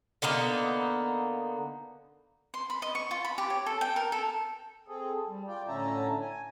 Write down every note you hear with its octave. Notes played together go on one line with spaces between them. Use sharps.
D3 A#3 B3 D#4
C6
B5
D#5
C#6
F4
B5
G4
C#5
A4
G5
A#4
A4
C4 G#4 A4
G3
F4 D5 G5
A2 D3 C#4 E5 A5 A#5
G#5